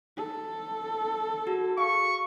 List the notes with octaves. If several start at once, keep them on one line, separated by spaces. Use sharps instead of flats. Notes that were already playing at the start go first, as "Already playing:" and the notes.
A4
F#4 G#4
F5 C#6